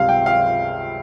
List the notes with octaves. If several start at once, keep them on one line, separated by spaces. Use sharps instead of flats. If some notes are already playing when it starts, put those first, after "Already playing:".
Already playing: C#2 C3 G3 F5
G5
F5